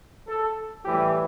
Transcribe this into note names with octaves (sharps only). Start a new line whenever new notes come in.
A4
A2 E3 G3 G4